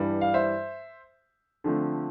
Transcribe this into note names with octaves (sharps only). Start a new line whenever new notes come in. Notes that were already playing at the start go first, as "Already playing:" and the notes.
Already playing: G2 E3 G3 D4
F5
C5 E5
D3 F3 A3 C4